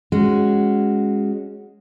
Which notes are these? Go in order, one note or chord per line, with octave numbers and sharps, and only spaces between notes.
G#3 C#4 F#4